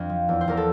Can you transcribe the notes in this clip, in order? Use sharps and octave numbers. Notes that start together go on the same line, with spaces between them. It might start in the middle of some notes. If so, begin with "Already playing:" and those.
Already playing: F2 D4 F4
F3
E2
C5
E2 A#4
A4